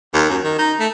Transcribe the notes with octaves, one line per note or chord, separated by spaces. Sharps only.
D#2
F#2
D#3
D#4
A3